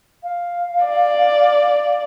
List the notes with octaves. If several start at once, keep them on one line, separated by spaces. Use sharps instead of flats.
F5
D5